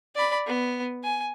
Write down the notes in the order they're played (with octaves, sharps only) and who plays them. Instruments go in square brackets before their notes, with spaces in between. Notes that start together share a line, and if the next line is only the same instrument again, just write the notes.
[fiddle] D5 B5
B3
G#5